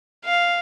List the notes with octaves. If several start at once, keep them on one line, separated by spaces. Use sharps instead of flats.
F5